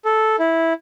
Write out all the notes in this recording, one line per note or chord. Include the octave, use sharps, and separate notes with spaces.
A4
E4